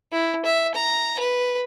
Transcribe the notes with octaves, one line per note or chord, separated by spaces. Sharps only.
E4
E5
A#5
B4